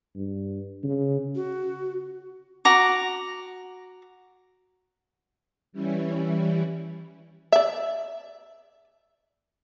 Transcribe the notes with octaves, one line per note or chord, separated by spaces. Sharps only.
G2
C#3
F#4
F#4 A#5 D6
E3 G3 C#4 E4
D5 E5